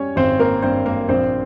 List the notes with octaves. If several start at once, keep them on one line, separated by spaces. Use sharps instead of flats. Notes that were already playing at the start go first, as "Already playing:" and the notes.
Already playing: G3 C#4 C#5
G#1 C4 C5
A#3 A#4
G2 C4 C5
A#3 A#4
A#1 C4 C5